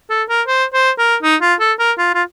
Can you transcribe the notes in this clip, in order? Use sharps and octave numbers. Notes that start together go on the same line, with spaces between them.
A4
A#4
C5
C5
A#4
D#4
F4
A4
A#4
F4
F4